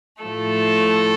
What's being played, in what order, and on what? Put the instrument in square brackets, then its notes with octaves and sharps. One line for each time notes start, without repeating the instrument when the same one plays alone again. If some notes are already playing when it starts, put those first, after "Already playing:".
[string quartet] A2 F3 A3 A4